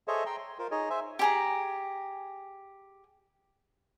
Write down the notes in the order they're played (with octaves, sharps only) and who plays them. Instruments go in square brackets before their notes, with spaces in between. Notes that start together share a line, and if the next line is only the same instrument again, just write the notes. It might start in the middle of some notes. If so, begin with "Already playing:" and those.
[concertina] G#4 A4 C5 C#5 D#5 E5
G5 A#5 C6
C6
F4 A#4 C5
D#4 G#4 C#5 D#5
C5 E5 G#5
[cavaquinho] G4 G#4 A#5